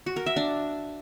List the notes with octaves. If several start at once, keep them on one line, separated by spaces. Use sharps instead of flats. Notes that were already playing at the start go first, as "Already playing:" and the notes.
F#4
A#4
E5
D4